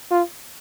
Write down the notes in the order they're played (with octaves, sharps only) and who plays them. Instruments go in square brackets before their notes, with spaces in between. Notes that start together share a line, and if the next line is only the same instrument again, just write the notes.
[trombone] F4